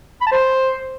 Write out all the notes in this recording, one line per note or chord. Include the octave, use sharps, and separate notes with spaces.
B5
A5
C5